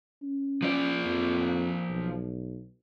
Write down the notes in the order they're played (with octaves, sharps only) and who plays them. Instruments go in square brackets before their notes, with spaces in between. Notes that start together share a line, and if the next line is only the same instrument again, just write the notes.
[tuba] C#4
[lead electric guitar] F3 D5
[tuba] F2
B1